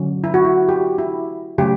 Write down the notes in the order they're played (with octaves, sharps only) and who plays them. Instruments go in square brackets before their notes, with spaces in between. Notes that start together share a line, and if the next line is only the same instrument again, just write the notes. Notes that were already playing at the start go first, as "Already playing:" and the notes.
Already playing: [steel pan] D3 F#3 C#4
E4
F#4
E4
G4
E4
C#3 F#3 A3 G4